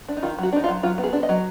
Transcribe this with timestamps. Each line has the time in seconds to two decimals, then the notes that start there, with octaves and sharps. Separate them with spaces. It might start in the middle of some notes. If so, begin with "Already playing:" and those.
0.08 D4
0.17 D#4
0.22 D#3 F4
0.39 F#3 F#4
0.52 D4 D#4
0.64 F4
0.69 F#3
0.83 F#3 F4
0.98 B3
1.04 G#4
1.13 D4
1.23 D#5
1.29 F#3